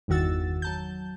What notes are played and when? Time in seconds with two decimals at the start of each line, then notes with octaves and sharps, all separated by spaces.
0.08 G1 E2 D#3 F#4 E6 A6
0.62 F#3 A5 G6